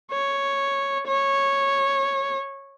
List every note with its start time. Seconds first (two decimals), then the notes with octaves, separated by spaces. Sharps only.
0.12 C#5
1.08 C#5